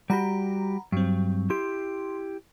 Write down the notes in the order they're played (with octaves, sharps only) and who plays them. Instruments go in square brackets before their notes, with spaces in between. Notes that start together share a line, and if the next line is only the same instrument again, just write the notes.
[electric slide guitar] G3 F#4 G4 [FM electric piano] F#5 A#5 B5
[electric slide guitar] G2 [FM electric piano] F#3 C4
[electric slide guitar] E4 G4 [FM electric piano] C6